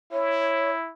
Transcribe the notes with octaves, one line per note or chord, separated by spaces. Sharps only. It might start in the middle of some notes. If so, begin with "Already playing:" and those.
E4 C#5